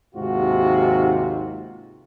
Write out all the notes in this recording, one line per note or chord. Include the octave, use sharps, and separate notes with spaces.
D#2 G#2 C3 F4 F#4